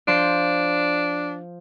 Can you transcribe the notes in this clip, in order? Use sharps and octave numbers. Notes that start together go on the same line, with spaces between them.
F3 D4 C6 G6